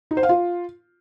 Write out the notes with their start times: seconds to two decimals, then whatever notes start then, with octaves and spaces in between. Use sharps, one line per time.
0.11 D#4
0.17 C5
0.23 F5
0.29 F4